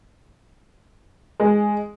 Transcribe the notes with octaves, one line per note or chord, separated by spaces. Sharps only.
G#3